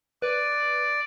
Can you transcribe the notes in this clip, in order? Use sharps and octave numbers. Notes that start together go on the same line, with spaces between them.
B4 D5